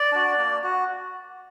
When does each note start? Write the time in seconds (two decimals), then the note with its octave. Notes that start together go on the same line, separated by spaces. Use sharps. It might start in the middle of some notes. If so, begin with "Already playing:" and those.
Already playing: D5
0.12 D4 F#4
0.38 A#3
0.63 F#4